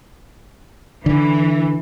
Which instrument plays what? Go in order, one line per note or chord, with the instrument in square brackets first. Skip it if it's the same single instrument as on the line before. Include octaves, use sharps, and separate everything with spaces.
[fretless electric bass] D3 [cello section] E3